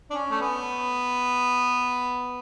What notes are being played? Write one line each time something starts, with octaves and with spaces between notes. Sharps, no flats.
D4
C#4
A3
B3